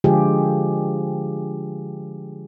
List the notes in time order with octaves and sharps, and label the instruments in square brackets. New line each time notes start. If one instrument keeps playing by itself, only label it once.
[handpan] D3 F3 G#3 F4 G4 G#4